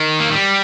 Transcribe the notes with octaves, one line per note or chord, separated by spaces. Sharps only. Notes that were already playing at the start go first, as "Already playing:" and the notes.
Already playing: D#3
A#3
G3